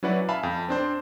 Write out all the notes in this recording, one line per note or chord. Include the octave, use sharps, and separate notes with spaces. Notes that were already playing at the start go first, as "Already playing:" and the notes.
F#3 C#4 E4 B4 D5 F#5
E5 F5 G#5 A5 B5
F2
C4 D4 C5